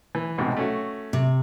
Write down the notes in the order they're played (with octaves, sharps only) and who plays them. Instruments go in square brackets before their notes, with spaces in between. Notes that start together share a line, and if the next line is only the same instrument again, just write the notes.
[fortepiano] E3
B1 G#2 C3
A3 C#4 F#4
[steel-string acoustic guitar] C3